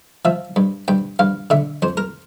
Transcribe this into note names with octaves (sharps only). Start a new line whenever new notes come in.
F3 E5
G2
G2 G5
G2 F5
D3 E5
F2 C5
A#4